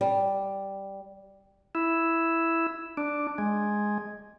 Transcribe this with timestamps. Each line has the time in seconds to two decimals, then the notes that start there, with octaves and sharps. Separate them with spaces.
0.01 G3
1.75 E4
2.97 D4
3.38 G#3